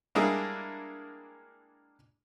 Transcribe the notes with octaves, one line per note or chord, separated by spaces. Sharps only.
G3 G#3 A#3 D4 E4 G#4